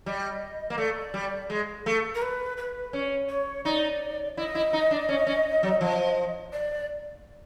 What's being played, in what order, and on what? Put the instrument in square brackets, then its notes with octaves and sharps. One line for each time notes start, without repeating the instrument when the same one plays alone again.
[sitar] G3 [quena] D#5
[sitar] A#3
[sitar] A3 [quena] D5
[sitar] G3
G#3
A3
[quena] A#4
B4
B4
[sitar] C#4
[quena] C#5
[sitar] D#4 [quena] D5
[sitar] E4 [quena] D#5
[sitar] E4
D#4
D4
C#4
C#4
F#3
F3
[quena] D5